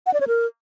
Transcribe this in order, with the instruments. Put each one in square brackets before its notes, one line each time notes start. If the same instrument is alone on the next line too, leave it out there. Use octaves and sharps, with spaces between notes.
[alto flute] F#5
D5
C#5
A#4